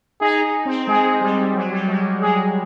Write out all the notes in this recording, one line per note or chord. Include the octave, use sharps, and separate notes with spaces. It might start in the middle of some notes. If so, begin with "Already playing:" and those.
D#4 G#4
D#4
C4
G#3 G#4
G3
F#3
G3
G#3
G#3 G#4